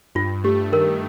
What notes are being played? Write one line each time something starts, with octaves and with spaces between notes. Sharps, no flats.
G2 F4
A3 G4
D#3 A#4